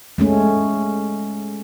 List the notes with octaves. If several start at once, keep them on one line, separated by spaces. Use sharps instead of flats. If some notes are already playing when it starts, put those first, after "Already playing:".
G#3 A3 C#4